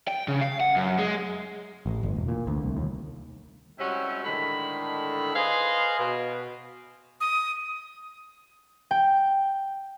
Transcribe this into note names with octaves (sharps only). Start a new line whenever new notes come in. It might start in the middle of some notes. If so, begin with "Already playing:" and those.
G5
C#3
F5
F#5
F#2
G#3
A1
G1
E1
A#2
D2
C2
D#2
C3 G3 G#3 C#4 E4 F#4
A2 D3 D#3 G#3 B5
G#4 B4 C5 D#5 F5
B2
D#6
G5